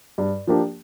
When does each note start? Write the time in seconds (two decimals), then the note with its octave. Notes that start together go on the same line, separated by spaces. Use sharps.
0.18 G2
0.47 F3 A#3 D4 G4